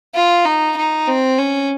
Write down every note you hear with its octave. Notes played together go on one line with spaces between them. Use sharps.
F4
D#4
D#4
C4
C#4